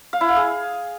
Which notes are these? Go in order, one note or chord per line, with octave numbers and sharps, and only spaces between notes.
F5
E4
F5
G#4